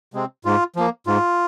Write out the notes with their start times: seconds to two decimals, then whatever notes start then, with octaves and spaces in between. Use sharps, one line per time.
0.14 C3 G#3 C4
0.45 G#2 F4
0.76 F3 A#3
1.07 G#2 F4